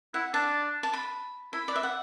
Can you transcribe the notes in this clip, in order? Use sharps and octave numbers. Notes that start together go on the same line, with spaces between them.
E4 F#5
D4 A5
A5
B5
E4 B5
D5
B4 E5
F#5